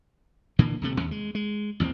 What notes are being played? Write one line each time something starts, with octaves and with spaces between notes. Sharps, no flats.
A#2 D3 E3 A#3
D#1 C3 A3
D#2 C#4
G#3
G#3
A1 D#2 B3 C4